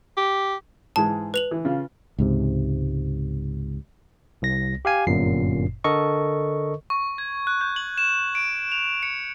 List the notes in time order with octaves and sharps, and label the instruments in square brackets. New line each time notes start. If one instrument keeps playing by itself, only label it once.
[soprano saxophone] G4
[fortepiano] G#2 E3 G#3 [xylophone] A5
[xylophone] B4 F7 F#7
[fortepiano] E3
C#3 F4
[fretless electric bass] C#2 G#2 C3
[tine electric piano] C2 A#6
G4 F5 G#5
G1 F#2 A#2 C7
D3 A4 A#4 D#5 C#6
[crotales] C#6
G#6
F#6
G6
F#7
E7
D7
F7
C#7